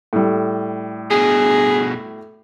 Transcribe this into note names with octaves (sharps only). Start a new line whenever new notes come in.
A2 G3
G2 B2 G#4